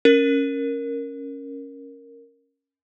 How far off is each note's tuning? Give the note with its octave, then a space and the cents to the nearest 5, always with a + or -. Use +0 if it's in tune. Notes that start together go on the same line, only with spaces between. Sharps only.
C#4 -5 A#4 +0